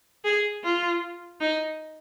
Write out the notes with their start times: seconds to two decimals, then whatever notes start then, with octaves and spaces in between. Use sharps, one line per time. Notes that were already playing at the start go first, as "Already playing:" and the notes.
0.25 G#4
0.64 F4
1.41 D#4